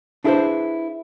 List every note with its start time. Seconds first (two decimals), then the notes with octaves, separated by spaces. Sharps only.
0.24 D4 E4 G#4 A4 B4 C5